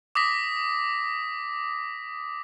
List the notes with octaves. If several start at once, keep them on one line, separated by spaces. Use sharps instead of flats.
D6 D#6 A#6 B6